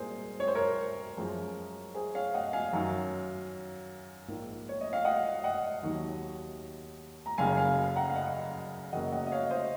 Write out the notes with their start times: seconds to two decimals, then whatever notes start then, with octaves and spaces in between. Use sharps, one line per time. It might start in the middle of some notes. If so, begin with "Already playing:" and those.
Already playing: C2 A#2 G#3 G#4 A#4 C5
0.40 C#5
0.48 C5
0.55 A#4 C#5
1.17 F#2 F3 G#3
1.95 G#4 C5
2.14 C#5 F5
2.34 D#5 F#5
2.53 F5 G#5
2.73 F#2 D#3 F#3
4.28 A#1 G#2 F3 A#3
4.69 C#5
4.81 D#5
4.93 F5
5.05 D#5 F#5
5.44 D#5 F#5
5.83 D#2 D#3 F#3
7.26 A#5
7.38 F#1 F#2 C#3 F5 G#5
7.57 F5 G#5
7.96 F#5 A#5
8.10 F5
8.15 D#5 F#5
8.92 F#2 C#3 F#3 A#3 D#5 F#5
9.12 D#5 F#5
9.27 D#5
9.32 C#5 F5
9.50 C5 D#5